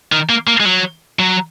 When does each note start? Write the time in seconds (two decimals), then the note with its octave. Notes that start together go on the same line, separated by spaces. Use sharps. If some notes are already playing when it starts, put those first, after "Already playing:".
0.12 D#3
0.29 A#3
0.47 A#3
0.60 G#3
0.65 F#3
1.19 F#3